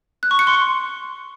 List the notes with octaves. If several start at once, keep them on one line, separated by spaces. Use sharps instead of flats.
F#6
C#6
C#7
C6